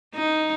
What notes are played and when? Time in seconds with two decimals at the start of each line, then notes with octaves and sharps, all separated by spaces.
0.14 D#4